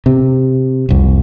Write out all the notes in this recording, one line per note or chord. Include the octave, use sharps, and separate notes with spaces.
C3
F1 C2